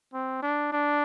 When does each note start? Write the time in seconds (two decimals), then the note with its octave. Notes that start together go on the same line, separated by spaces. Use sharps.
0.14 C4
0.42 D4
0.72 D4